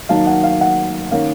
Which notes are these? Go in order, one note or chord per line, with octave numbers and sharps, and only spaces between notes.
D#3 F#3 A#3 D#4 F5 A5
F#5
F5
F#5
D#3 A#3 C#4 F5